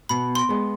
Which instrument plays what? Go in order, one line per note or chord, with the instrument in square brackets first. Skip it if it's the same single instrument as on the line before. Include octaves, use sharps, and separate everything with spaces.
[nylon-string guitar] B2 [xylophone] B5
[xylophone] C6
[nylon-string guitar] G#3 B3